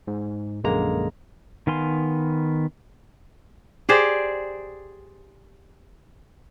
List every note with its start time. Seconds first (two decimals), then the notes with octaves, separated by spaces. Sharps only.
0.07 G#2
0.64 A#1 F#2 D3 G#3 A#3 A#5
1.67 D#3 B3 F5 G#5 C6
3.89 G4 G#4 C5 D5